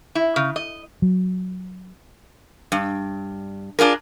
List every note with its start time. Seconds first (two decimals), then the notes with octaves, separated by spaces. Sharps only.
0.15 E4
0.36 C#3
0.56 D#5
1.02 F#3
2.72 G2
3.79 D4 F4 G#4 A#4